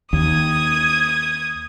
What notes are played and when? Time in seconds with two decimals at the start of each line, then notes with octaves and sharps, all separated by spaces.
0.13 D#2 D#6 G#6